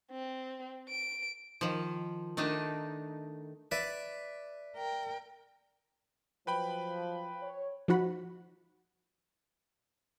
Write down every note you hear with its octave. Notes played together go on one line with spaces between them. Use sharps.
C4
D7
D#3 F3
D#3 A3 D4 D#4
B4 D5 E5
A#4 G5
F3 F#3 B4 G5 B5
C#5
F3 D#4 F#4 F#5 B5